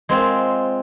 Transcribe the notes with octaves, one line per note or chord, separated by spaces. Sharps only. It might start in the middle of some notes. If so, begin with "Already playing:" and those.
G#3 C4 F4